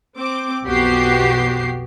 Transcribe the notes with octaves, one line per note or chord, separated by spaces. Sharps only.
C4 D6
B1 F2 B3 F#4 G4 C7